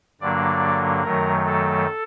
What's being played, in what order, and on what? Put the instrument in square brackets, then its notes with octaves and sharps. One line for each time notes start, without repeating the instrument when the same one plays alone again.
[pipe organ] G2 D3 F#3 A#3 D4 D5
F#2 D#3 F#3 A3 A#4
A4